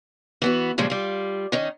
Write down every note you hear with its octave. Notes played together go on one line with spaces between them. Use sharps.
E3 B3 F#4
A#2 C#3 F3 G3 G#3
G3 F4
D#3 C#4 D#4